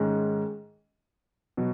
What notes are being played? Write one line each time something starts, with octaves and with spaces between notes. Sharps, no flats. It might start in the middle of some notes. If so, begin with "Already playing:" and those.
Already playing: G#2 D#3 G#3 C#4
B2 F#3